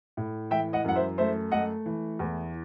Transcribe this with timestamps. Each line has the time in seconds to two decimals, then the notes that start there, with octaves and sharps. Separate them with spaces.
0.17 A2
0.51 E3 E5 G5
0.73 D#5 F#5
0.84 F#2 F#5
0.95 C5 E5
1.18 A3 C5 E5
1.51 A3 D#5 F#5
1.86 E3
2.19 E2